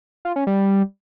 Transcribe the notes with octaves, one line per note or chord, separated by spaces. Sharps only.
F4
C#4
G3